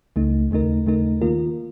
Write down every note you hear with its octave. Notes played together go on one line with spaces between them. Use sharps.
C#2 C#3 A3 D#4
D#2 C#3 A3 D#4 A#4
D#2 C#3 A3 D#4 A#4
D#3 A#3 F4 A#4